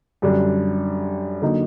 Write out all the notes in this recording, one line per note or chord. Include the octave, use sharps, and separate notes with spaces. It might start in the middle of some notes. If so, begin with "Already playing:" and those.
F#2 D3 G3 D4
D3 F#3 A#3 D#4